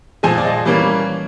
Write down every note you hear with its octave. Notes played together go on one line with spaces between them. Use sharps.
A#2 F3 G#3 G#5
D5
D#5
E3 G3 A#3 C#4 D5